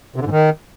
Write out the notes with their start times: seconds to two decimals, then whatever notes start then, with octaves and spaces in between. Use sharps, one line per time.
0.16 C3
0.21 D3
0.26 G#2
0.31 D#3